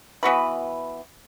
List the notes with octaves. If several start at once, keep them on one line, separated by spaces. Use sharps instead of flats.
E3 B3 F#4 B4